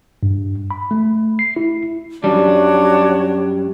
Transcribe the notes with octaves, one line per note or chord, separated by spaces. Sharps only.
G2
B5
A3
C7
E4
F#2 G3 D4 F#4 C#5